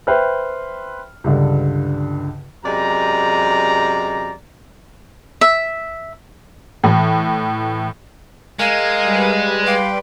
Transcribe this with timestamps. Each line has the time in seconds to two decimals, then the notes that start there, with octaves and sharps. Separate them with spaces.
0.07 B4 C5 E5 G5 F6
1.24 C#2 G2 D3
2.65 F#2 C3 G#3 D5 A#5
5.41 E5
6.84 A2 E3
8.59 G#3 A#4 F5 G#5
9.04 G3 B4
9.67 G4 F5 G5 C6